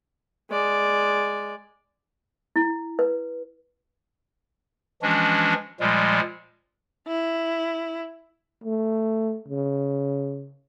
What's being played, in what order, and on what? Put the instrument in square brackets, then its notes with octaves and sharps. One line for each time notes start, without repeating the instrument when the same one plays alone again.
[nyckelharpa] G#3 D5
[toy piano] E4
B4
[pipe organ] E3 F3 G#3 C#4 D4 F#4
A#2 F3 G3 G#3
[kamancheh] E4
[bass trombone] A3
C#3